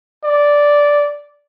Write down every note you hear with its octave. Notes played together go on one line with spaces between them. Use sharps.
D5